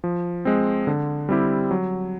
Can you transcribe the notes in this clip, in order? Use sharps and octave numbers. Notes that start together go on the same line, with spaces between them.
F3
G#3 C4
D3
G3 C4 E4 G4
F#3